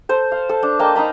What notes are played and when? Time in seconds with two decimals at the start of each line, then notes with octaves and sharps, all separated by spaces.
0.09 A4 C5
0.32 F5
0.49 A4
0.63 D4
0.79 A#3 D#5 G5 A5
0.95 D#4 F5 A#5 B5